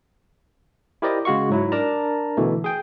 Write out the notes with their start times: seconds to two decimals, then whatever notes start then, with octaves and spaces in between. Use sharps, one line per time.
1.02 E4 G4 A#4 C5 D5 D#5
1.25 C#3 G#3 F#4 F5 C#6
1.49 G#2 F#3 E4
1.72 D4 A#4 D5 A5 A#5
2.37 B2 D3 E3 A3
2.64 G#4 G5